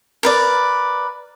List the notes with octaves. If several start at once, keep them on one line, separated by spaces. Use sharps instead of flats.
A#4 B4 D5